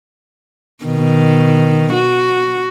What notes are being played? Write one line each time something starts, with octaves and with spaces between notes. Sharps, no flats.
B2 D#3
F#4